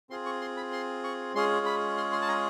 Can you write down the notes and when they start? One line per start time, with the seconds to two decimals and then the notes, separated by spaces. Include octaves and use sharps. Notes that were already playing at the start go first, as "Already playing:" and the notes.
0.10 C4 F4 G#4 C6
0.26 C#6
0.41 C6
0.57 B5
0.72 C6
1.04 C#6
1.35 G#3 C#4 F4 G#4 C6
1.66 B5
1.97 C6
2.12 C6
2.22 A5
2.28 A#5